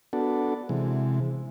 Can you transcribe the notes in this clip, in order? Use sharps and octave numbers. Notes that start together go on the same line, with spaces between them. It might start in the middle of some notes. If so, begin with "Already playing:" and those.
B3 D4 F#4 A4
C3 E3 G#3